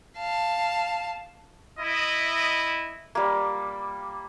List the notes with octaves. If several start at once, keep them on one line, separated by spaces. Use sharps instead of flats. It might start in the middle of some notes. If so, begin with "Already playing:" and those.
F5 A5
E4 D#5
G3 A#3